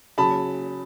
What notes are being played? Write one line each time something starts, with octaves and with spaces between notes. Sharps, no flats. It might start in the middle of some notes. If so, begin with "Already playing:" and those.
C#3 F#3 A5 B5